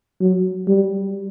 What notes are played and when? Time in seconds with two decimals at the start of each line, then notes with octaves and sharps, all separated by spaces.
0.21 F#3
0.68 G3